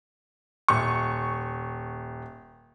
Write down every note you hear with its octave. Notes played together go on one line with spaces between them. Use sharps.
D#1 C#6